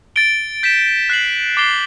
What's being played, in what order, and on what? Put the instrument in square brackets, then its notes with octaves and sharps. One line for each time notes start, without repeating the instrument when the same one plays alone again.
[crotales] A6 D7 G7
G6 B6 E7
F#6 C7 F#7
D6 A6 C7 G7